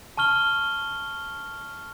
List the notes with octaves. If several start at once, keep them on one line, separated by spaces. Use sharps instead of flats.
A5 C#6 F6 G7